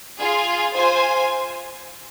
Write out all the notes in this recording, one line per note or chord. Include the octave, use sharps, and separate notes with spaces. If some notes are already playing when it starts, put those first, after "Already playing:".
F4 G#4 F5 G#5
F4 C5 G#5